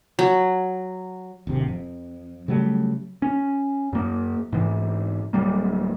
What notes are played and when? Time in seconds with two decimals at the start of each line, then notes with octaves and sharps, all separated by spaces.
0.19 F#3
1.47 D1 D#2 C3
1.68 F2
2.48 C#3 F#3 G3 A3
3.22 C#4
3.93 F#2 A#3
4.53 G#2 E3
5.33 D1 F#3 G3 A#3